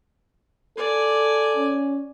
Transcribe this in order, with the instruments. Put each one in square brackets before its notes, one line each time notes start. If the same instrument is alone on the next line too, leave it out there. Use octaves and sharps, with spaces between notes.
[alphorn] A4 [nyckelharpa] D5 G#5
[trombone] C#4